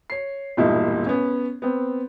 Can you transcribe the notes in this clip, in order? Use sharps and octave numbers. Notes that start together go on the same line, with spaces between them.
C#5 C7
E1 G2 A#2 D#4 E4 E5
B3 C#4
B3 C4